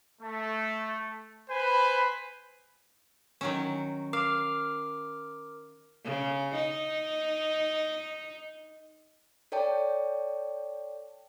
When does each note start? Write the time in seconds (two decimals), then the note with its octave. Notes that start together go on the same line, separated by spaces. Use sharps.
0.20 A3
1.49 B4 C5 G#5 B5
3.41 D#3 F#3 C#4
4.13 A#4 F5 D6 F6
6.05 C#3
6.55 D#4
9.52 A4 C#5 D5 G5 A5